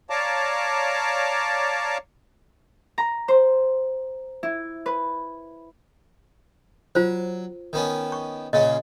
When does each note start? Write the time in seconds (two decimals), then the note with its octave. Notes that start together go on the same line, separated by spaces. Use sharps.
0.10 C#5 D5 F5 A5 A#5 D6
2.98 A#5
3.28 C5
4.43 E4
4.86 B4
6.95 F#3 F4 C5
7.73 D#3 B3 C#4
8.12 C#6
8.53 A#2 C#3 C#4 D#5